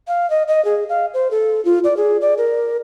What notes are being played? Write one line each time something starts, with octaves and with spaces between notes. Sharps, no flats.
F5
D#5
D#5
G#4
F5
C5
A4
F4
D5
G#4
D5
A#4